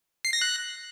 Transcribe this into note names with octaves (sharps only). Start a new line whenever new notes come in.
C7
A#6
F#6